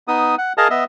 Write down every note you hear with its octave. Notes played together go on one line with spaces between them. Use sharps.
B3 D#4 D#6
F#5
G#4 A#4 D#5 F5 A5 A#5
B3 D#5 E5